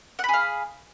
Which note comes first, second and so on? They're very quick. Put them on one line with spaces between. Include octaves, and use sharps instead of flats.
F#5 B5 G#4 F5